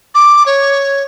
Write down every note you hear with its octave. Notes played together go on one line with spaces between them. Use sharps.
D6
C#5